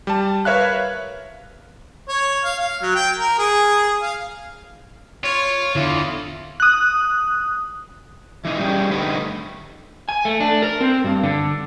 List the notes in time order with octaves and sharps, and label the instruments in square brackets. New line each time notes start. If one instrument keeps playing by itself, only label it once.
[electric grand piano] G3 A5
A#4 B4 C#5 E5 F5 F#6
[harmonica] C#5
F5
F5
F#3
G5
A#4
G#4
F5
[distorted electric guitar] F4 [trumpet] C#5
[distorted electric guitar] E2 [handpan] D3 E4 [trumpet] F4
[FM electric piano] D#6 F#6
[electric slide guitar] E3 D#4
G3 C#4 G4 G#4
D3 A3 D#4 G4 B4
G#5
A3
D4
A#4
C4
G2
D3